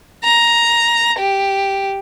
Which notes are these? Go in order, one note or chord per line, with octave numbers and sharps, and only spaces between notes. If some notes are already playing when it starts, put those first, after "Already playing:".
A#5
G4